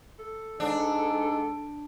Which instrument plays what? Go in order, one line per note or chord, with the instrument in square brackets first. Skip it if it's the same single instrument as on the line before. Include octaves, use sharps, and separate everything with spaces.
[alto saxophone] A4
[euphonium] G#2 [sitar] D4